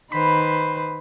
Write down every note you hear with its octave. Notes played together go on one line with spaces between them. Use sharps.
D#3 B4 C5 B5